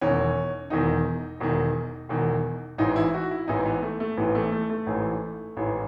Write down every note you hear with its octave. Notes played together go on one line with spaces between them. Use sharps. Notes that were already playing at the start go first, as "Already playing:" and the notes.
E1 E2 D#3 C#4
E1 E2 D#3 D#4
E1 E2 D#3
E1 E2 D#3
A1 G#2 E3 D#4
E4
F#4
E4
A1 G#2 E3 D#4
B3
A3
A3
A1 G#2 E3 B3
A3
A3
A3
A1 G#2 E3
A1 G#2 E3